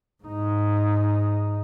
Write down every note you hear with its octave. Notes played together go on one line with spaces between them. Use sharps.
G#2 D#4